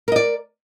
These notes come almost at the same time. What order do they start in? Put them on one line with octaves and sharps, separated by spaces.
A#4 D#5 D5